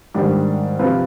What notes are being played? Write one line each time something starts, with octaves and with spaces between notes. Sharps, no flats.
G#2 D#3 G3 D4 G4
C3 F3 C4 F4 B4